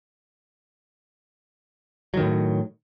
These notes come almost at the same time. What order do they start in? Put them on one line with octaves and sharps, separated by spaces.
F#3 D#3 A2